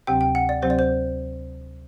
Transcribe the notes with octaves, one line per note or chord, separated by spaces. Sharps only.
D2 C3 F#3 C4 G4 G5
G5
F#5
D5
D2 C3 F#3 C4 G4 C5
D5
C5